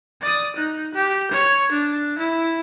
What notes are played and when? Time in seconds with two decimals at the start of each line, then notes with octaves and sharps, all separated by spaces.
0.22 D5 D#6
0.56 D#4 F#6
0.94 G4
1.32 C#5
1.72 D4
2.19 E4